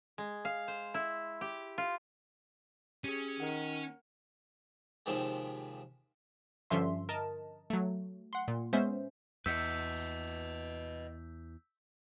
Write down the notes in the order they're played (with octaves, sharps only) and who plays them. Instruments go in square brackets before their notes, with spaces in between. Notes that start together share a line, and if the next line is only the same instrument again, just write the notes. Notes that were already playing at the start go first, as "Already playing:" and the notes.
[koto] G#3
F5
C5
E4
G4
F4
[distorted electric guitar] C#4 [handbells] G4 G#4
[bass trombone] D#3 [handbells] A#4 F#5
[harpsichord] D#2 C3 D#3 F3 G#3
[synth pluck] G2 D3 F3 C#4 E5 C6
A#4 D#5 A5
F#3 A3
F#5 C6
A#2
G#3 B3 C#4 C5 E5
[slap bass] E2 [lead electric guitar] B4 D#5 [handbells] E6 G6 B6